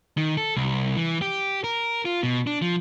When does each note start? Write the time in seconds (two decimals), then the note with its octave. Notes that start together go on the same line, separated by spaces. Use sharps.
0.18 D#3
0.37 A4
0.56 C2
0.97 E3
1.21 G4
1.64 A#4
2.05 F4
2.23 B2
2.47 D4
2.62 F3